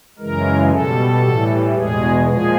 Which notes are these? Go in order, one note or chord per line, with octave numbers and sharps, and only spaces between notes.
F#2 C#3 E3 G#3 A#4
B2 G3 A4
A2 E3 G3
E2 B2 G#3 G#4
A#2 F3 G#3 G#4